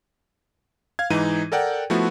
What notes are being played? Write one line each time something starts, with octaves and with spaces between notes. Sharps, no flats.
F5 G#6
G#2 E3 D#4 D#7
A4 A#4 D5 F#5 G5
F3 A3 B3 E4 F#4